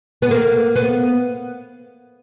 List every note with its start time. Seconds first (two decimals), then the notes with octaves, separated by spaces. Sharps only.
0.22 B3
0.31 A#3
0.76 B3